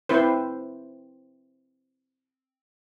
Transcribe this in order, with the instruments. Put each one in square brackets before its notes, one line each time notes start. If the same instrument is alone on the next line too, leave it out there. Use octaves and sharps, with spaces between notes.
[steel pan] C4 E4 B4 C5